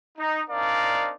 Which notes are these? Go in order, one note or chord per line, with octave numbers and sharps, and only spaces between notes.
D#4
C4 D4 D#4 A#4 D5 F5